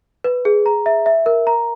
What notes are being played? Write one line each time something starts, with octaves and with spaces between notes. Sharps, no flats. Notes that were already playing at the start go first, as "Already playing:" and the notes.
B4
G#4
A#5
E5
E5
A#4
A#5